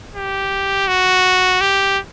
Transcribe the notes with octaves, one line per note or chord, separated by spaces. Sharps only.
G4
F#4
G4